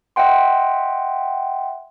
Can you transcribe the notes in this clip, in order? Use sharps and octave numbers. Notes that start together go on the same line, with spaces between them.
D#5 E5 F#5 G5 C6